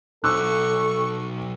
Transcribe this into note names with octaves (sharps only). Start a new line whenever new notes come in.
B1 A4 C#6 D6 E6 F#6